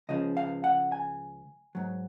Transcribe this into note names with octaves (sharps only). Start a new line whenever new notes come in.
C#2 C#3 F3 G#3 D#5
F5
F#5
G#5
G#2 F#3